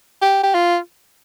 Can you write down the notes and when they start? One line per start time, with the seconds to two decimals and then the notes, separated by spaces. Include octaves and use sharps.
0.22 G4
0.43 G4
0.54 F4